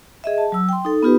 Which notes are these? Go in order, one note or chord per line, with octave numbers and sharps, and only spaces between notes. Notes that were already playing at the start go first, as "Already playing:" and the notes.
G#4 D#5 E5
A5
F#3 E6
G5 C6
D#4 A4
B3 D#4 F4 G4 B4